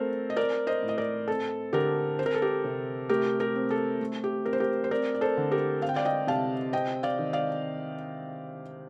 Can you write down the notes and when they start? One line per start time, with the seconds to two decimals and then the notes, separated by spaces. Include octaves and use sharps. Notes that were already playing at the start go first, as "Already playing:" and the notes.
Already playing: A3 C4 A4 A#4 C5
0.30 D#5
0.37 C4 A#4 D5
0.67 C5 D#5
0.82 A2
0.89 D#5
0.98 A#4 D5
1.27 C4 A4
1.73 D3 G4 A#4
2.19 C4 C5
2.26 A#4
2.35 A4
2.42 G4 A#4
2.64 C3
3.09 A3 G4 A#4
3.40 G4 A#4
3.55 C4
3.71 A4
4.01 A3
4.24 G4
4.45 C4 A#4
4.53 C5
4.60 G4 A#4
4.84 C5
4.91 C4 A#4 D5
5.15 D5
5.21 A4 C5
5.37 D3
5.51 G4 A#4
5.82 C4 F5
5.89 G5
5.96 D5 F5
6.05 D#5 G5
6.27 C3 F5 A5
6.73 C4 D#5 G5
7.03 D5 F5
7.19 D#3
7.33 D5 F5